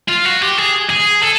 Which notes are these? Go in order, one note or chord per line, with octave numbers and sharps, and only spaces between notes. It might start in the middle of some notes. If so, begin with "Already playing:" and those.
F4
F#4
G4
G#4
G#4
A4